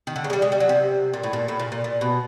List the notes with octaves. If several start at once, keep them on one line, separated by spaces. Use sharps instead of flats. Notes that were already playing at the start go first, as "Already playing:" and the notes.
D#3
D3
C#3
G#3
G3
G#3
G3
F#3
C3
A#2
A2
A#2
A2
A#2
A#2
A#2
B2